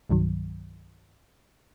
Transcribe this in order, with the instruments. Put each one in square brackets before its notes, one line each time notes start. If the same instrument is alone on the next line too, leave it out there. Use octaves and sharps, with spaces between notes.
[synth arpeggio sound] C2 G2 D#3 F#3